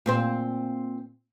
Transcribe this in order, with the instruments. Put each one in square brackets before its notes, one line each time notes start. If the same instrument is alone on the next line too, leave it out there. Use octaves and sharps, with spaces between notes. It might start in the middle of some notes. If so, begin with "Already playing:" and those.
[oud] A#2 C4 C5